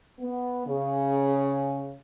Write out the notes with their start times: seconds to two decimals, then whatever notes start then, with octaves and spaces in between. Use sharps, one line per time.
0.19 B3
0.65 C#3